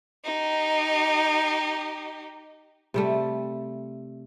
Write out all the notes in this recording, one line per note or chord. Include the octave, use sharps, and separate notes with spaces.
D#4 G4
C3 G3 A3